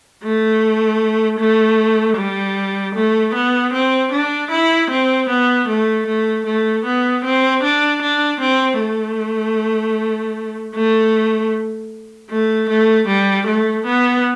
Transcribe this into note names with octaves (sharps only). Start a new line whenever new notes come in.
A3
A3
G3
A3
B3
C4
D4
E4
C4
B3
A3
A3
A3
B3
C4
D4
D4
C4
A3
A3
A3
A3
G3
A3
B3